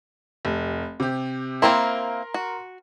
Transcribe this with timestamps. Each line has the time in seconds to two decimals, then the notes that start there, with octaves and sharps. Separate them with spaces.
0.45 F1
1.00 C3 G4
1.62 A#3 C4 E4 A#4 A#5 C6
2.34 F#4